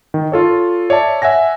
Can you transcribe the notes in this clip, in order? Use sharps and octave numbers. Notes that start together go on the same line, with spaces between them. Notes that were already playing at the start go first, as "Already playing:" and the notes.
D#3
F4 A4 C#5
C#5 D5 E5 A5
E5 F#5 G#5 A#6